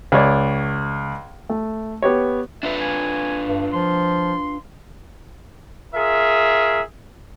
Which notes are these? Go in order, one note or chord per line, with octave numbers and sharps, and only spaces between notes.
C#2 C#5 D5
A3
B3 G4 C#5
D4 F4 B4 E5
G#5
G2
F3 C6
F4 G#4 A#4 E5